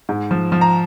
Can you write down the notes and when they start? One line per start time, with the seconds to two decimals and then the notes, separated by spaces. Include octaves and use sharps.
0.09 G#2
0.31 F3
0.52 F3
0.61 A#5